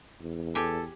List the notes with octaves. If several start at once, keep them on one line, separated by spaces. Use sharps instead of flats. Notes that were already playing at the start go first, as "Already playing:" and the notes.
E2
G4 A4 G#5